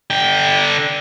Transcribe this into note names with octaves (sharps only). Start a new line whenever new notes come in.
D3 G5